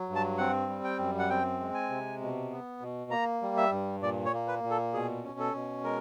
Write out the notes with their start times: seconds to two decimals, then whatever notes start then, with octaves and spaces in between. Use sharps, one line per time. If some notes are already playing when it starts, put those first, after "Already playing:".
Already playing: F#3
0.09 G2
0.15 A5
0.38 C4 F#5
0.68 G3
0.84 G5
0.99 F#2
1.19 F#5
1.30 C4 G5
1.60 G#3
1.74 G#5
1.90 C3
2.21 B2
2.51 B3
2.82 B2
3.11 A#3 A#5
3.42 G3
3.57 E5
3.72 G2
4.02 A#2 D5
4.25 C#5
4.33 A#3
4.48 B4
4.63 A#2
4.71 A4
4.93 B2 G#4
5.24 C#4
5.39 A4
5.54 B2
5.84 G#3 A#4